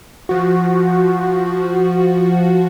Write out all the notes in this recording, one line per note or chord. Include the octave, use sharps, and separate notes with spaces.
F3 F#4